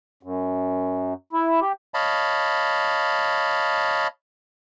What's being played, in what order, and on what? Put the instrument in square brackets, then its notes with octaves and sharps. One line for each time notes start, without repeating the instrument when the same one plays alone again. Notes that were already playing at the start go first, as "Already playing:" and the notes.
[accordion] F#2
E4
G4
[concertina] C#5 D#5 F5 A5 B5